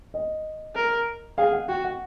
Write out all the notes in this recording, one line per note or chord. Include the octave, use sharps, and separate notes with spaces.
D#5
A#4
G#4 F5
F#5
F#4 G5
F#5